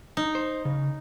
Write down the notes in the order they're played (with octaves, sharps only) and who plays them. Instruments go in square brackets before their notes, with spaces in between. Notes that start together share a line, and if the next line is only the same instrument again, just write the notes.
[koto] D#4
[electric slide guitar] C5
C#3